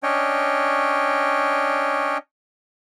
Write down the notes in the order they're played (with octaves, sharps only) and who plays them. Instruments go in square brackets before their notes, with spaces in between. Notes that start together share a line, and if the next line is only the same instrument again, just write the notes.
[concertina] C#4 D4 C#5 D#5 G5